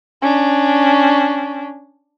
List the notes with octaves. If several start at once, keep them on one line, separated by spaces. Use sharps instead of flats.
C#4 D4